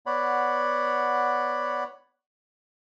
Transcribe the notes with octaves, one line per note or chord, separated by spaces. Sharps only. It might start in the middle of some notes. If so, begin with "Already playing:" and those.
B3 C#5 D5 F#5 B5